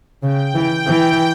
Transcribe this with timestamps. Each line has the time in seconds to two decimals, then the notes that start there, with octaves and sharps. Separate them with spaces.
0.23 C#3 G5
0.54 E3
0.87 E3